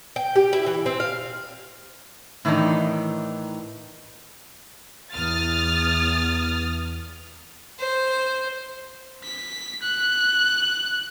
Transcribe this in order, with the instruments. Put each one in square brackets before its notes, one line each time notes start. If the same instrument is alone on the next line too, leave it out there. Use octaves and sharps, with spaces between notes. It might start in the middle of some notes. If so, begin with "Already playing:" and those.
[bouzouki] G5
G4
E4
E3
C4
F5
[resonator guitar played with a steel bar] A2 D#3 E3 D4 D#4
[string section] E2 D#6 F6 A6
[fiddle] C5
[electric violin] B6
F#6